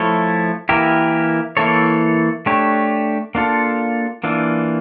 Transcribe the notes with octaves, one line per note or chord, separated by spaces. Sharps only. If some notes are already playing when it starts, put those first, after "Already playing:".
Already playing: F3 A3 E4 A4 C#5
E3 A#3 E4 G4 A#4
E3 A#3 E4 A4 C#5
A3 D4 G4 C#5
A#3 D4 F4 A4
E3 A#3 D4 F4